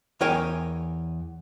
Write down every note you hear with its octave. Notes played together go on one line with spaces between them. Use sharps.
E2 A#4 C#5 G5 G#5